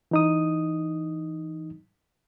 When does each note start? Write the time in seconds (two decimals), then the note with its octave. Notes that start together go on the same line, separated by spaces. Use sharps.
0.11 E3 D#4 D#6